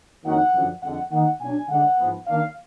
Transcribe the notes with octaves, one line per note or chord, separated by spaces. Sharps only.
F2 D#3 F#3 A#3 D#4 F#5
F#2 D3 F3
F2 D3 G#3 F#5
D#3 A#3 D#4 F#5
B2 F#3 D4 G#5
D3 G#3 D4 F#5
G#2 F3 B3
D#3 A#3 D4 F5